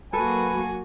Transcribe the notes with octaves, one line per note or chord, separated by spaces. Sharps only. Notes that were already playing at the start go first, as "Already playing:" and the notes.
F#3 A#3 F#4 A4 B4 G#5